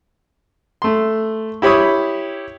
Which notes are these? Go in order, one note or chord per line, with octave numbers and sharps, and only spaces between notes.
A3 C6
E4 G4 C#5 B5 D#6